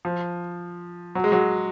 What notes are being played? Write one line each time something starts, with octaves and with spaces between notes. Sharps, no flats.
F3
F#3
G#3
F#3